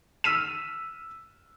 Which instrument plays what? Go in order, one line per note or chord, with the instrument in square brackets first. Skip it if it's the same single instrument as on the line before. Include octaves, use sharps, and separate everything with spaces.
[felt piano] E6 F6 B6 D#7 E7